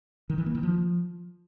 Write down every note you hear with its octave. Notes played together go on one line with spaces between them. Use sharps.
D#3
E3
A#3
D#3
F3